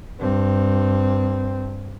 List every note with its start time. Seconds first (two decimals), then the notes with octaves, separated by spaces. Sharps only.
0.19 G2 C4